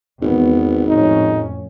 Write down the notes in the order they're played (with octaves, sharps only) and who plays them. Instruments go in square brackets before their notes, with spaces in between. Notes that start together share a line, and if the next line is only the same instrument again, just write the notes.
[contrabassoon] G#1 [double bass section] E2 B3
[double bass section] F2 A2 C#4 [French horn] D#4